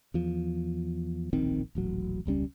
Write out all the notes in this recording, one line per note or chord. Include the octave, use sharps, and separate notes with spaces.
E2 F3
D1 A#1 D#3 C4
D#1 A1 F#3
E1 C#2 G3 C#4